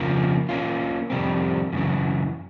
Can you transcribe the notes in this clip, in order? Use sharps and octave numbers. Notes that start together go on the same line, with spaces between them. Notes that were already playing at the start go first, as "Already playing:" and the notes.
Already playing: F2 C#3 F3 A#3
A#3 C#4 F4
F2 C3 D#3 G3 C4
F#2 C#3 E3